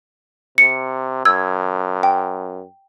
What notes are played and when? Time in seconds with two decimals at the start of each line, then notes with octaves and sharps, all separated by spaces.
0.58 C3 C#7
1.25 F#2 E6 G#6
2.03 G5